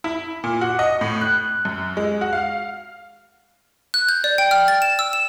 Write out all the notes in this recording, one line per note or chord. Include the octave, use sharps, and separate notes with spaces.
E4
A#2
F#4
D#5
A2
F#6
F#2
G#3
F#4
F5
F#6
G6
D5
G5
F6
A6
E7
E6
E7